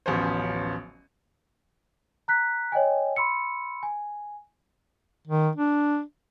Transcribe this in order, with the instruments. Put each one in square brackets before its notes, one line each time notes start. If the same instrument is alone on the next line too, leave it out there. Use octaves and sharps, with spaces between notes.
[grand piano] D1 A1 F3 B3 C#4 C5
[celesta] A#5 F#6 B6
C#5 D#5 G5 G#5
B5 C6 E6 C#7
G#5
[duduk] D#3
D4